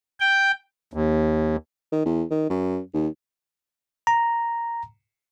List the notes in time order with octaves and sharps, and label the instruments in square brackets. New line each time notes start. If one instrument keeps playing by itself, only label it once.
[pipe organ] G5
[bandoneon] D#2
[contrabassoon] D#3
E2
D#3
F#2
D#2
[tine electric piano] A#5